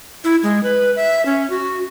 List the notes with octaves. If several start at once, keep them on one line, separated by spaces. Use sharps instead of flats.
E4
G#3
B4
E5
C#4
F#4